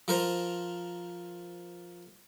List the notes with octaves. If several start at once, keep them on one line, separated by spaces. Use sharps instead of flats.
F3 A#4 C5